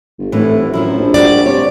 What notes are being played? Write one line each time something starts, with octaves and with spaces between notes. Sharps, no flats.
G1
F1 A2 E3 A3
F#2 D#3 F3 E4
A#1
G3 F#4 D5
C3 C#5